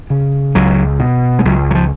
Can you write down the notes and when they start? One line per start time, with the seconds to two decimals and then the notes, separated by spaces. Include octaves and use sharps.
0.10 C#3
0.55 C#2 F#3
1.00 B2
1.39 G#3
1.45 C#2 F#3
1.71 F#3
1.75 F3